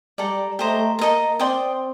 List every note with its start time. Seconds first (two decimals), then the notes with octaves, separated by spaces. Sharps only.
0.18 G3 A4 D5 G5 A#5
0.59 A3 G4 C5 D#5 A#5
0.99 A#3 A4 D#5 A#5
1.39 C4 D5 G5 C6 D#6